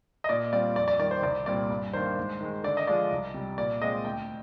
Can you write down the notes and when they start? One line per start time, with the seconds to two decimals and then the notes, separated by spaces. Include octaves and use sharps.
0.24 D#5
0.29 A#2 D5
0.53 G3 C4 F4 D5
0.76 F2 D5
0.88 D5
0.99 D#3 G3 D5
1.11 C5
1.23 C2 D5
1.46 A#2 G3 C4 D5
1.70 G2
1.93 D#3 A#3 D4 C5
2.17 G#2
2.40 D#3 G#3
2.64 D3 D5
2.77 D#5
2.87 F3 G#3 D4 F4 D5
3.11 C2
3.34 C3 G3
3.58 A#2 D5
3.82 G#3 C4 F4 D#5
4.05 D2 G5